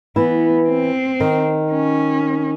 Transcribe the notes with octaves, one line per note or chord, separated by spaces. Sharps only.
E3 B3 E4
C4
D#3 D#4
C#4